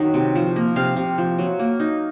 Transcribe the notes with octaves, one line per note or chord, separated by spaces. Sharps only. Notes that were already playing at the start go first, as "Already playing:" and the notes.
Already playing: D#3 F#3 D#4
C3
F3
A#3
C3 F5
C3
F3
F#3
A#3
D#4